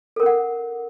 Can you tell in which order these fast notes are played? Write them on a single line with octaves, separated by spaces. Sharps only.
A4 A#4 C#4 F#5